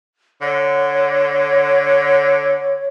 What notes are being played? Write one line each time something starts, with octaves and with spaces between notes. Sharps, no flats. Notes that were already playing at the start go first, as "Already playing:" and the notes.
D3 C#5